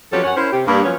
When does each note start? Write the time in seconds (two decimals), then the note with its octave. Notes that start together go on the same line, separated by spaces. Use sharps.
0.12 F3 F#3 B3 C#4 G4 A4
0.24 F#2 C#4 C#5 F#5
0.36 C#4 E4 A#4 C5
0.52 C3 G4
0.67 G2 A#3
0.83 F3 F#3 B3 C#4